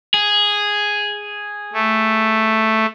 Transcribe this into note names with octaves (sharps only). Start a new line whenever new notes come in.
G#4
A3